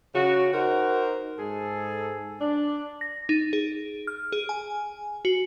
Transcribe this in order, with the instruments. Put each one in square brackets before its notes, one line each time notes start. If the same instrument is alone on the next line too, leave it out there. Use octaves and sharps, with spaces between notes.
[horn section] C#3 F#4
D#4 F#4 A#4 C5
G#2 G#4 A4
D4
[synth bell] A#6
D#4
G#4
F6
G#4
G#5
F#4